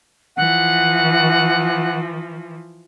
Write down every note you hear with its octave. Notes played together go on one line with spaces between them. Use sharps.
E3 F3 F#5